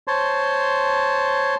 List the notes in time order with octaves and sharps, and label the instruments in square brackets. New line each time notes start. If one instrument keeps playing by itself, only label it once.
[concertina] C5 C#5 A5 C6